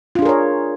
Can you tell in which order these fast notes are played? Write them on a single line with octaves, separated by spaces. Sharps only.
F4 D4 G#4 A#4 C#5